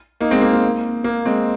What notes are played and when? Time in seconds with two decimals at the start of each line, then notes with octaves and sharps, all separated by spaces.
0.21 A#3 D#4
0.31 G#3 C4
0.42 A#3
0.53 A#3
1.04 A#3
1.25 G#3 C4